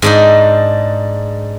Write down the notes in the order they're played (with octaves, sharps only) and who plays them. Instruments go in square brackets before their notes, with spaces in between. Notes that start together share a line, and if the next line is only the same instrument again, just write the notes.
[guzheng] G#2 D4 D#4